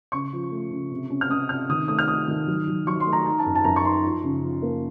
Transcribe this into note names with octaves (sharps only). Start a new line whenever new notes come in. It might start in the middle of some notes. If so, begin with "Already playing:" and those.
C#3 C#6
F3
A3
C#3
C3
C#4
F6
C#4 D#6
C3 F6
D#3 D#6
A3 D#6
F6
A3 D#6
D#3
F#3
F#3
F#3 C#6
C6
A3
A#5
D#4 A#5
A5
F#2
A5
F#2 A#5
C#6
D#4 C6
F3
C#3
F3
A#3